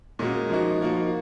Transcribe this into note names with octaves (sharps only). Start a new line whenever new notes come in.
A#2 G#3 C#4 F#4
F3 A#3 D#4 F#4
F3 A#3 D#4 F#4